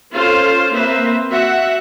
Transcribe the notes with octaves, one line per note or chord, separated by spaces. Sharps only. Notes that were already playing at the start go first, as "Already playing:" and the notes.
C#4 F4 A4 C5
A#3 C4 B4 C5 E5
F#4 E5 F#5